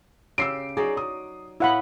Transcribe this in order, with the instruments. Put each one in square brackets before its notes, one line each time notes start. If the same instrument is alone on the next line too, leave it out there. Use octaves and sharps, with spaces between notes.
[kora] C#3 G4 [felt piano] E6 C7 D7
[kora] F#3 D#4 D5 [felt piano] G#4
[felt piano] D#6
[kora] A2 B3 [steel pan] E4 F#5 B5 [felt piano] F5